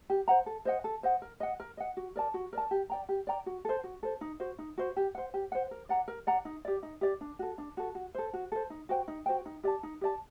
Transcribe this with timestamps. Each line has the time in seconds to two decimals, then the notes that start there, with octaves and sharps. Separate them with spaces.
0.10 G4
0.28 C5 F#5 A#5
0.46 A4
0.65 C5 D#5 F#5
0.84 A4
1.03 C5 D#5 F#5
1.22 A#4
1.40 D#5 F#5
1.60 A#4
1.77 D#5 F#5
1.97 F#4
2.16 A#4 D5 A5
2.34 F#4
2.53 A#4 D5 A5
2.71 G4
2.90 D5 G5 A#5
3.09 G4
3.27 D5 G5 A#5
3.46 F#4
3.65 A4 C5
3.84 F#4
4.03 A4 C5
4.21 D#4
4.40 F#4 C5
4.59 D#4
4.78 F#4 C5
4.97 G4
5.15 C5 F#5
5.34 G4
5.52 C5 F#5
5.71 A#4
5.89 D5 F#5 A#5
6.08 A#4
6.27 D5 F#5 A#5
6.45 D#4
6.65 G4 D5
6.83 D#4
7.01 G4 D5
7.21 D4
7.39 F#4 A4
7.58 D4
7.77 F#4 A4
7.95 F#4
8.15 A4 C5
8.33 F#4
8.52 A4 C5
8.70 D#4
8.89 F#4 C5 G5
9.08 D#4
9.26 F#4 C5 G5
9.46 D#4
9.64 G4 D5 A5
9.83 D#4
10.01 G4 D5 A5